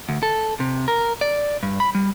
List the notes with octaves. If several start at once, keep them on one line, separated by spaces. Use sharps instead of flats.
D2
A4
C3
A#4
D5
G2
B5
G3